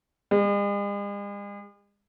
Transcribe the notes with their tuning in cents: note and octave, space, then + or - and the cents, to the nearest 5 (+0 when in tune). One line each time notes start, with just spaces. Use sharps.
G#3 -45